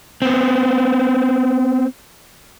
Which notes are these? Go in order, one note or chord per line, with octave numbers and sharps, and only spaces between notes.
B3 C4